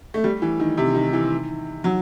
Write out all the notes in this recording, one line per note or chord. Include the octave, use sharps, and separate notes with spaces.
A3
G3
E3
D#3
C3
D#3
E3
F#3